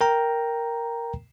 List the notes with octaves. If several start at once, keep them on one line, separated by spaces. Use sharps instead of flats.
A#4 G5 A#5